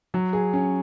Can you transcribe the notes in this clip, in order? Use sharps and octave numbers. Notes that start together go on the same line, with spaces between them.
F#3
G#4
C#4